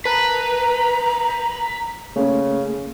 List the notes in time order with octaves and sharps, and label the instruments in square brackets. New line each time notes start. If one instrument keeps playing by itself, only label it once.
[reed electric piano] A#4 A5 F#6 [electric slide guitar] B4 [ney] A#5
[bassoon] C#3 [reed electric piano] A3 A#3 C#4